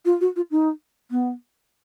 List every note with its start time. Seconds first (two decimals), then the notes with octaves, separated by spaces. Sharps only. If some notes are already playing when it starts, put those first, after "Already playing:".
0.05 F4
0.21 F#4
0.36 F4
0.51 D#4
1.11 B3